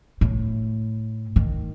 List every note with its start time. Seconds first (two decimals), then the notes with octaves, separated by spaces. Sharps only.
0.21 A2
1.36 D#3